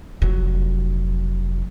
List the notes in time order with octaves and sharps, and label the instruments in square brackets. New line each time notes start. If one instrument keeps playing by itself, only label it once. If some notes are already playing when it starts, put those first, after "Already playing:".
[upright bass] F1 F#3